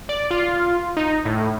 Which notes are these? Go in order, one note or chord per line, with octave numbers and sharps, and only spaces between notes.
D5
F4
D#4
A2